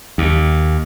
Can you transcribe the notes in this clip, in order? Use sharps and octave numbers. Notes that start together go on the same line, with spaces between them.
D#2